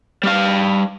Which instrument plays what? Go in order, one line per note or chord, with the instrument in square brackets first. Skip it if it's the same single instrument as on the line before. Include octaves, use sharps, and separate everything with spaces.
[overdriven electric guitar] G3 F5